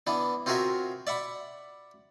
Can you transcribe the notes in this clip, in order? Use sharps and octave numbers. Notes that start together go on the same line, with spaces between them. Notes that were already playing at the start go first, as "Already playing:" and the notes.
E3 B3 D4
C4 F4 F#4 G#4 A#4 E5
D5 E5 F#5 B5